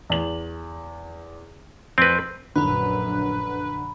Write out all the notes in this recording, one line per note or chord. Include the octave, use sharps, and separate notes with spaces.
E2 F#7
F2 C4 B4
A#1 F#2 D3 B4 A#5 B5